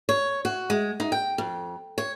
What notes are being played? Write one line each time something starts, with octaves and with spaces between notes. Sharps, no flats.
C#5
F#4
G#3
D#4
G5
F2
C#5